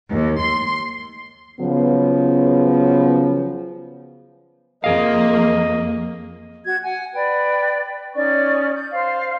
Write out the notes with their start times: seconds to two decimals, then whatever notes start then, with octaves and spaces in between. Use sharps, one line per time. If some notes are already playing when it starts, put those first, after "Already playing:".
0.11 D#2
0.42 C6
1.60 C#3 F3 F#3 B3
4.84 F2 A#3 G#4 D#5 F5
6.66 F#4 G#6
6.83 F#5 G#5
7.15 B4 D5 G5
8.15 C#4 D#4 D5 C#6
8.73 G6
8.92 C5 F5